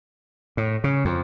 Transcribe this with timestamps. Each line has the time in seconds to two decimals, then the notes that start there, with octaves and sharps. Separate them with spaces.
0.57 A2
0.84 C#3
1.05 F2